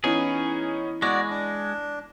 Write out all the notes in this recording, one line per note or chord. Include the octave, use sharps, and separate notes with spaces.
E3 B3 C#4 D#4 E4 G#4
G#3 B3 F#4 D5 G#5 A#6
D4